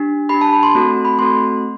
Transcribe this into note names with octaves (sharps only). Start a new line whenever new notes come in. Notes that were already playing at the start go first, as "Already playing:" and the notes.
Already playing: D4 G4
D4 G4 B5
A5
B5
C6
A3 C4 F#4 A4
B5
A3 C4 F#4 A4 C6